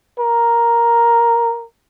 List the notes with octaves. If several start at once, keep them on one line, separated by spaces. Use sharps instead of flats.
A#4